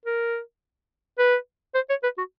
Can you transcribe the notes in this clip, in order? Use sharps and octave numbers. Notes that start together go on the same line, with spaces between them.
A#4
B4
C5
C#5
B4
F#4